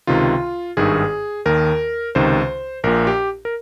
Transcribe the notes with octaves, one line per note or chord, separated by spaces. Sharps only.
C#2 C3 D#3 F4
G#1 G2 D#3 G#4
D#2 D#3 A#4
C#2 C3 D#3 C5
A#1 A#2 A#4
G4
A#4